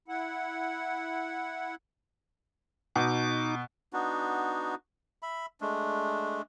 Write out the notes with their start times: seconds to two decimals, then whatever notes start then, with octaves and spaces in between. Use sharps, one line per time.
0.08 E4 F#5
2.96 B2 D#4 D6
3.93 B3 D4 D#4 F#4
5.23 E5 B5
5.61 G#3 A3 D4